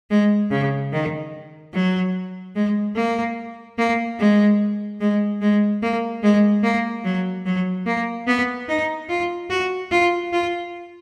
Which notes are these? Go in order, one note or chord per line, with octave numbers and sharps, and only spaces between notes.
G#3
C#3
D#3
F#3
G#3
A#3
A#3
G#3
G#3
G#3
A#3
G#3
A#3
F#3
F#3
A#3
B3
D#4
F4
F#4
F4
F4